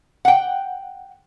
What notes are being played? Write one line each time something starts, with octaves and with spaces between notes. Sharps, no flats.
F#5 G5